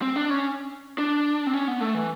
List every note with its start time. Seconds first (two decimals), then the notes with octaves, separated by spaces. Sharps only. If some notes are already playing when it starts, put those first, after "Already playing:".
0.02 C4
0.16 D4
0.30 C#4
0.98 D4
1.47 C4
1.54 C#4
1.68 B3
1.81 A3
1.95 E3